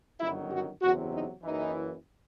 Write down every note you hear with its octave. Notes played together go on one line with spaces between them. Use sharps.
G1 F#2 D#3 F#3 E4
F#4
F#1 E2 C3 F#3 F#4
D#4
F#1 F#2 E3 D#4